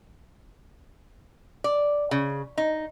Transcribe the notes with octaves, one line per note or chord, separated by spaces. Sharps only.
D5
C#3
D#4